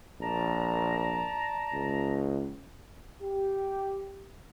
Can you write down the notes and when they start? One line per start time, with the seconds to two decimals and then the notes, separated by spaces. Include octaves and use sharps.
0.21 A#1 D5 A5 A#5
1.73 C#2
3.22 G4